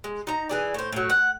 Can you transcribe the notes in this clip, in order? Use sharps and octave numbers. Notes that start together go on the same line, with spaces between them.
G#3
D#4 A#5
E3 G#4 D5
A2 C5
A2 F#3
F#5